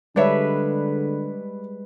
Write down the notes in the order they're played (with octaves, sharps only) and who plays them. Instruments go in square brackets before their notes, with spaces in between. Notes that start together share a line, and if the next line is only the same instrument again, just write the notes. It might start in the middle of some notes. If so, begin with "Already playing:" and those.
[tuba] D3 [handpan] G3 G#3 B4 [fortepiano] D4 C#5 E5